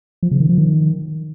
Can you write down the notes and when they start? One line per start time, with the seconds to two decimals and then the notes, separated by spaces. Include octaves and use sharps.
0.23 F3
0.31 C#3
0.40 D#3
0.49 F3
0.58 D#3